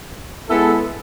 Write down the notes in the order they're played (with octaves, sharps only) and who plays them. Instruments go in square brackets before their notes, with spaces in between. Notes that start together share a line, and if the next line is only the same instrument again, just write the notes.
[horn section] G#3 B3 E4 A4